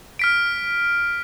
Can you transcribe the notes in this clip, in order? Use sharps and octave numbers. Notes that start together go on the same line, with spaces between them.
F6 B6 D7